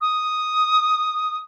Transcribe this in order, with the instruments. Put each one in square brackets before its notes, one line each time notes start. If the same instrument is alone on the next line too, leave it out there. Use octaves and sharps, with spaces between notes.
[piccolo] D#6